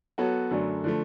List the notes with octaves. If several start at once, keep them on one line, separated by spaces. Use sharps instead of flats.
F#3 B3 F#4 A4 C#5
F#2 D3 F#3 A3 D4
D3 F3 A3